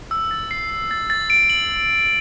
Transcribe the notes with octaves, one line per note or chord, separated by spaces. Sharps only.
E6
A6
C7
C7
A6
A6
D7
F#7